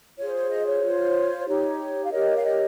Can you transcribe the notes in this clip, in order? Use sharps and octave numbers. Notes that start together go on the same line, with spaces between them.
F4 G#4 C5 C#5
C#5
D#5
C#5
F4 C5
D#4 G4 C#5
F5
G4 A#4 C#5 D#5
F5
D#5